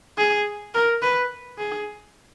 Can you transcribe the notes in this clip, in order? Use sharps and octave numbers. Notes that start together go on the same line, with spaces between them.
G#4
A#4
B4
G#4